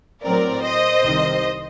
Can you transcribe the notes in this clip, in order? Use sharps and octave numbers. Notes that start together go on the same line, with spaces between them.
A2 F#3 C4 A#4 D5
C5 D#5
C2 C3 D#3